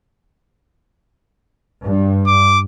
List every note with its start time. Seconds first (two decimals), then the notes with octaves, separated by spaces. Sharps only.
1.84 G2
2.27 D6